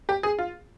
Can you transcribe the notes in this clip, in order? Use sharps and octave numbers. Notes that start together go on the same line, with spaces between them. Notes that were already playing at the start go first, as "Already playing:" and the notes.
G4
G#4
F4